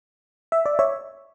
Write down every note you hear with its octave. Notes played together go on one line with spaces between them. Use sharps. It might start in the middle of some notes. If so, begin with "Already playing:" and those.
E5
D5
C#5 E5